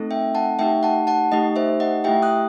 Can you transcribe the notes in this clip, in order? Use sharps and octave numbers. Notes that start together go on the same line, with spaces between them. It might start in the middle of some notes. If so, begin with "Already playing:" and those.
Already playing: A3 C4 D#4 A4
E5 G5
F#5 A5
A3 D#4 G4 E5 G5
F#5 A5
F#5 A5
A3 D#4 G4 D#5
C5 E5
D#5 F#5
A3 E4 G4 E5 G5
D#6 F#6